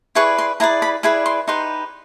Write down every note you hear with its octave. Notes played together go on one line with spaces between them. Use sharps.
E4 G#4 B4 D5 C#6
C6
E4 G#4 B4 D5 A#5
B5
E4 G#4 B4 D5 B5
C6
D#4 G4 B4 C6